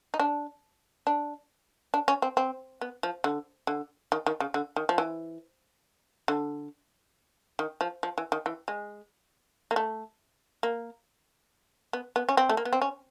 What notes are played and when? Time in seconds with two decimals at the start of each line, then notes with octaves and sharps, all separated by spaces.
0.14 D#4
0.20 D4
1.07 D4
1.94 D4
2.08 C#4
2.22 C4
2.37 C4
2.81 B3
3.03 F3
3.24 D3
3.67 D3
4.12 D#3
4.26 D#3
4.40 C#3
4.54 D3
4.76 D#3
4.89 F3
4.98 E3
6.28 D3
7.59 D#3
7.81 F3
8.03 F3
8.18 E3
8.32 D#3
8.46 E3
8.68 G#3
9.71 A#3
9.76 A3
10.63 A#3
11.93 B3
12.16 B3
12.29 C#4
12.37 C4
12.49 A3
12.57 A#3
12.65 B3
12.73 C4
12.82 C#4